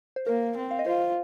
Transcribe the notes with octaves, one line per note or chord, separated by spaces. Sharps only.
C5
A#3 A#4
C4
F5
D#5
F4 C5